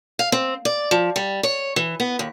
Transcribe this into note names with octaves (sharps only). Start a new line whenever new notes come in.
F5
C4
D5
F3
G3
C#5
E3
B3
D#2